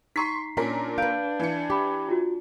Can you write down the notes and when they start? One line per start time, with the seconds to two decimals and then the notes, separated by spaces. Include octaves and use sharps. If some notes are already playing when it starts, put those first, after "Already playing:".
0.16 D#4 A#5 C6 C#6 B6 C7
0.57 A#2 C#4 D4 A#4 B6
0.98 B4 F5 G6 D7
1.40 E3 C#7
1.70 G4 B5 D6
2.09 F4 F#4